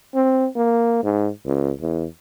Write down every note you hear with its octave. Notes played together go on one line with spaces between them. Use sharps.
C4
A#3
G#2
C#2
E2